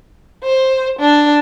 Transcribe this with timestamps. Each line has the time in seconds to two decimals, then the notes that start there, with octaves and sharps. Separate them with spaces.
0.44 C5
0.99 D4